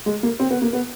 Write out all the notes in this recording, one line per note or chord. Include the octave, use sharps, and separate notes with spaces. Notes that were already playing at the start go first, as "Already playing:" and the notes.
G#3
A#3
C4
B3
A#3
B3